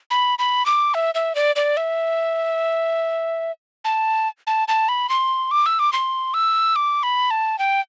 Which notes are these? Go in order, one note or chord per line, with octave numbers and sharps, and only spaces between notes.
B5
B5
D6
E5
E5
D5
D5
E5
A5
A5
A5
B5
C6
D6
E6
D6
C6
E6
D6
B5
A5
G5